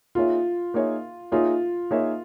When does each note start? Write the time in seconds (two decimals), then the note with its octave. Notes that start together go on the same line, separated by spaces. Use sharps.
0.15 A#3 D#4 F4 G#4 C#5 E5
0.74 A#3 D#4 G#4 C#5 E5
1.32 A#3 D#4 F4 G#4 C#5 E5
1.91 A#3 D#4 G#4 C#5 E5